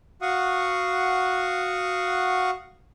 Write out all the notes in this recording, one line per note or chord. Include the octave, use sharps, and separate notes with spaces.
F#4 F5 F#5 C#6 D#6